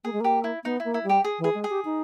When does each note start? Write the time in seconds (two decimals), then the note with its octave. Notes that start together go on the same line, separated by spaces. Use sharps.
0.04 A#3 G#4
0.13 G#3
0.21 A#3 G4
0.44 E4
0.64 B3 D#4
0.80 A#3 E4
0.94 E4
1.04 G3
1.09 G4
1.24 G#4
1.39 E3
1.44 G#4
1.55 G#3
1.64 G#4
1.70 G4
1.85 D#4